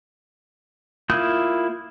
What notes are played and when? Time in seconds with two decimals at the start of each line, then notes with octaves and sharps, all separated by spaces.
1.10 A#3 E4 F4 D#6 G6